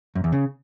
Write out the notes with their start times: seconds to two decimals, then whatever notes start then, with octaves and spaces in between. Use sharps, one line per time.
0.15 F#2
0.24 E2
0.32 C#3